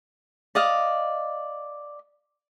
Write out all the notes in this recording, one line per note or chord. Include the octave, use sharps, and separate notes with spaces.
D5 D#5 F5